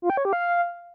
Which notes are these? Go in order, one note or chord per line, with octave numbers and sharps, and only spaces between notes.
F4
G5
C#5
G4
F5